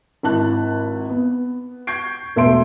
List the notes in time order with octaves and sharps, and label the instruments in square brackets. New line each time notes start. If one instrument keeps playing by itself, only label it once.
[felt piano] G#1 E4 A5 F#6
B3
C#6 G6 G#6 C7 D7
E1 A3 B3 E5 C6 D7